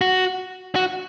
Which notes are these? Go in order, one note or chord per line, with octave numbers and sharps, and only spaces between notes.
F#4
F#4